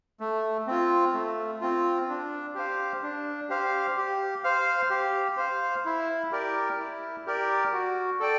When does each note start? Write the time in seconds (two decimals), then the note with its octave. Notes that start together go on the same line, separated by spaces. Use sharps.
0.20 A3
0.67 C4 F4
1.14 A3
1.61 C4 F4
2.09 D4
2.55 G4 C5 F5
3.03 D4
3.49 G4 C5 F5
3.97 G4
4.44 C5 F5
4.90 G4
5.37 C5 F5
5.85 E4
6.31 G4 A#4 D5
6.79 E4
7.26 G4 A#4 D5
7.73 F#4
8.20 A4 D5 G5